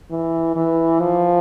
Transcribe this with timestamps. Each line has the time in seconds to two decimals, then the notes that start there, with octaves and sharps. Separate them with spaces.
0.11 E3
0.56 E3
1.00 F3